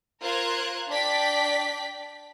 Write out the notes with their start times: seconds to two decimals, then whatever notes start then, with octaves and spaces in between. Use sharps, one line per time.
0.23 F4 A#4 C5 F#6 G#6
0.89 D4 D5 G5 B6